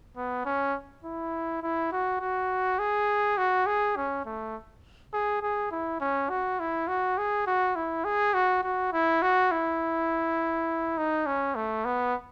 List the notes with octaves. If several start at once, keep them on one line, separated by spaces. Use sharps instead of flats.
B3
C#4
E4
E4
F#4
F#4
G#4
F#4
G#4
C#4
A3
G#4
G#4
E4
C#4
F#4
E4
F#4
G#4
F#4
E4
G#4
F#4
F#4
E4
F#4
E4
D#4
C#4
A3
B3